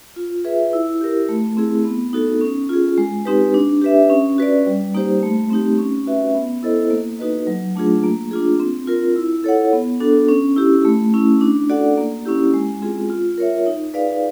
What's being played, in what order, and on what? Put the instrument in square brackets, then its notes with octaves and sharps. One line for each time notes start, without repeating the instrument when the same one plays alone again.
[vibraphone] F4
G#4 B4 E5
E4
G4 A#4
A3
C4 E4 G#4
B3
D#4 F#4 A4
C#4
F4 G#4
G#3
C4 D#4 G4 B4
D4
G4 B4 E5
C#4
F#4 B4 D5
G3
A#3 D#4 G4 C5
A3
C4 D#4 G4
C#4
F#4 B4 E5
B3
E4 A4 C5 D#5
A#3
D#4 F#4 B4 D#5
F#3
A3 D4 F4 G#4
A#3
D4 F4 G#4
C4
F4 A#4
E4
A4 C#5 F#5
B3
D4 F#4 A4
C#4
E4 G4
A3
C#4 E4
D4
F#4 A4 D5 F#5
A#3
C#4 E4 G4
G#3
C4 F4 G#4
F4
A#4 C#5 E5
D#4
G#4 B4 D5 F5